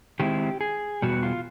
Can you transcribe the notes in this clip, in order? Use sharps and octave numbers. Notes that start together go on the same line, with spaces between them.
D#3 G#3 C4 E4 G4
G#4
E2 B2 G3 B3 F#4
F4